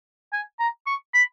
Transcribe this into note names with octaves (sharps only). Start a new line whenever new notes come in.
G#5
A#5
C#6
B5